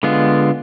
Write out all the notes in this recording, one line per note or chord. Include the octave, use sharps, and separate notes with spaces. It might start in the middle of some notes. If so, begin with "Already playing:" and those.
D3 G#3 B3 F4